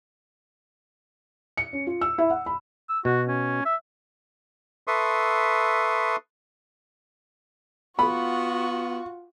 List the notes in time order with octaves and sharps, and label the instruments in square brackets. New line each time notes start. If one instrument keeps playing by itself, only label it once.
[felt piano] C#7
C#4
F4
E6
E4
F#5
B5
[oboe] E6
[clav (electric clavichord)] B2 [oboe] F#4
[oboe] C#4
E5
[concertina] A4 B4 E5 C6 C#6 D#6
[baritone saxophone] B3 [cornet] F4 [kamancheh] F#4 C#6 [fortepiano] B5